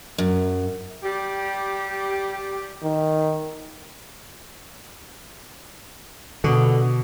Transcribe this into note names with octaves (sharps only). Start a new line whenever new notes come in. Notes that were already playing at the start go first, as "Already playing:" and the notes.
F#2
G3 G4
D#3
B2 D3